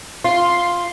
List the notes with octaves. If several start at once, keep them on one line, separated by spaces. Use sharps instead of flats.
F4 C6